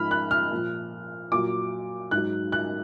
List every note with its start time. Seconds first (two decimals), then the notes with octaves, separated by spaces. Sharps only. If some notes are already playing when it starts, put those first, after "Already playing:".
Already playing: G#2 F3 B5 F6
0.11 F#6
0.31 F6
0.51 A#2 F3
1.32 A#2 F#3 D6
2.11 G#2 F#6
2.17 F#3
2.52 F#6